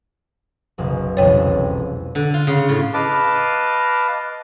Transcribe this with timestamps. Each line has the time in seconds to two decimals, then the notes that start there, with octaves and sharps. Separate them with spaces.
0.78 F#1 B1 C#3
1.17 E1 C2 F2 C#5 G5
2.15 D3
2.34 F4
2.47 C#3
2.69 A2
2.94 B4 D#5 F5 A5 D6